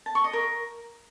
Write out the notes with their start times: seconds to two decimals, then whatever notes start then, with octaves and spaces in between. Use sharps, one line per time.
0.06 A5
0.15 C#6
0.24 D#5
0.33 A#4